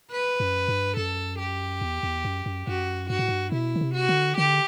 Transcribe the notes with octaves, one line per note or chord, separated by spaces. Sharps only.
B4
F#2
G2
F#2 A4
G4
E2
E2
F#2
F#2
F#2 F#4
G2 F#4
A2
G2
B2 E4
D3
C3
F#4
D3
D3 G4